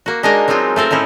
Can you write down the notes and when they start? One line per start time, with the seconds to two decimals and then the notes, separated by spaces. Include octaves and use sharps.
0.06 A#3 F#4
0.23 G#3 A#3 D4 D#4 A#4 D#5
0.48 F#3 G#3 C4 D#4 F4
0.76 A3 C4 A4 A#4
0.91 A2 C#4 D#4 E4